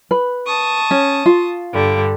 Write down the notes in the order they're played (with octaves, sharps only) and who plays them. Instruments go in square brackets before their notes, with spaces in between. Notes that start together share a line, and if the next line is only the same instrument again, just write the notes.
[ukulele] B4
[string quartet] A5 C#6 D#6
[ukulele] C#4
F4
[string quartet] G2 D3 G3